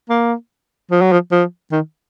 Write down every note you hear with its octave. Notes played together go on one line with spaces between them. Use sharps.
A#3
F3
F#3
F3
F3
D#3